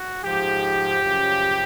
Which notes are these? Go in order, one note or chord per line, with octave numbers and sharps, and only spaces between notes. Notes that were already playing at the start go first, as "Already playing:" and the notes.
Already playing: F#4
G#2 F3 G4
F#2 C#3 F3